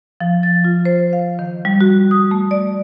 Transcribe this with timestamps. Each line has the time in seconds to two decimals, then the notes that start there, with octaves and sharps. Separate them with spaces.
0.20 F3
0.43 A6
0.64 F4
0.85 C5
1.13 F5
1.39 D#3
1.65 G3
1.81 F#4
2.11 D#6
2.31 A3
2.51 D5